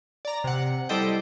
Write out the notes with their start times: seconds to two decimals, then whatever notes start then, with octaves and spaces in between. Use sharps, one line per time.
0.25 D5 A#5
0.44 C3 F#5
0.89 G3 E4 A4 C5 D#5 G5